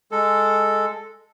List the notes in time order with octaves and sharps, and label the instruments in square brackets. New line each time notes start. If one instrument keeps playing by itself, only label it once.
[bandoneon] G#3 A4